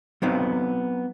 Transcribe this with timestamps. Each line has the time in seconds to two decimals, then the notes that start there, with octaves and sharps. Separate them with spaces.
0.22 F#3 B3 C4 D#4 C5 F5